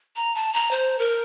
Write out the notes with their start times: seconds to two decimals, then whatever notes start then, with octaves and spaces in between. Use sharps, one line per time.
0.16 A#5
0.35 A5
0.53 A#5
0.71 C5
0.99 A#4